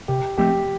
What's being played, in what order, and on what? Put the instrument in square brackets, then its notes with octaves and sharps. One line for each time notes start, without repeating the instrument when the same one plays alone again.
[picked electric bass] C3 [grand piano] G4
[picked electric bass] F3 A3 C4 [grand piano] G4